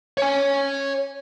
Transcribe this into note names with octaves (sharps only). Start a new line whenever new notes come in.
C#5 G#5